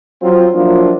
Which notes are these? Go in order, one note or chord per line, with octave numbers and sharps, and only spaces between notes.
F#3 C4 F4
F3 F#3 A#3 D4 E4 F4